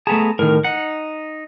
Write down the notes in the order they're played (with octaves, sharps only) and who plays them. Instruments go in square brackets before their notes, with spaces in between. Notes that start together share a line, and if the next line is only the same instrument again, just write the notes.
[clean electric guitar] A3 B3 G#4 [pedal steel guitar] A5 A#5
[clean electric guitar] A2 D#3 [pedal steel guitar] A#4 F6
[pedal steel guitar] D#4 [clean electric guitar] F#5